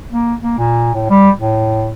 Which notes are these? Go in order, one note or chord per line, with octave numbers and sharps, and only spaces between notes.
A#3
A#3
A#2
A2
G3
A2